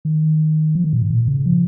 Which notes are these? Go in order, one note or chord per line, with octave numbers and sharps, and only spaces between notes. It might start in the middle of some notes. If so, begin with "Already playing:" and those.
D#3
F3
D#3
A#2
G#2
A#2
C#3
F3